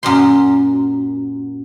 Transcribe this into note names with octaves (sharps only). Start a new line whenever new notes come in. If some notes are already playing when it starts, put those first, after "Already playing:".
F#2 A#2 C6